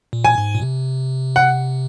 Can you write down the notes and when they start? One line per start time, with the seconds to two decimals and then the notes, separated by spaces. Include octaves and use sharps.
0.13 A#2
0.25 G#5
0.38 G#2
0.55 A#2
0.61 C3
1.36 F#5